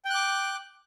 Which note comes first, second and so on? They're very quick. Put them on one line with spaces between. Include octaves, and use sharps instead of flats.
G5 F#6 D6